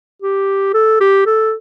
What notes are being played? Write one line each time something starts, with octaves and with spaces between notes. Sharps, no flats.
G4
A4
G4
A4